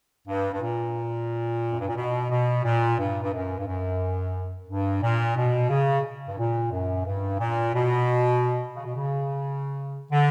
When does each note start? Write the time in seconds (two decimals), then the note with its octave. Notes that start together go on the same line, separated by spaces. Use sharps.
0.27 G2
0.52 G2
0.61 A#2
1.72 F#2
1.80 G2
1.89 A#2
1.96 B2
2.30 B2
2.64 A#2
2.98 G2
3.22 G2
3.33 F#2
3.58 G2
3.66 F#2
4.68 G2
5.03 A#2
5.36 B2
5.70 C#3
6.29 G2
6.38 A#2
6.72 F#2
7.06 G2
7.40 A#2
7.74 B2
8.75 C#3
8.85 B2
8.96 C#3
10.11 D3